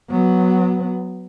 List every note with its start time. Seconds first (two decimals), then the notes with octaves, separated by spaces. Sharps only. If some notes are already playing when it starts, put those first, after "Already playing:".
0.10 F#3 B3